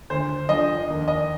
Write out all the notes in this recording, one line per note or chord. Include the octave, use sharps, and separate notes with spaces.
D2 C5
D3 F3 D#5
D#2
D#5